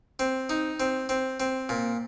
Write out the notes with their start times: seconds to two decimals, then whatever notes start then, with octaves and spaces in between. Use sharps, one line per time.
0.19 C4
0.50 D#4
0.80 C4
1.09 C4
1.40 C4
1.69 A#2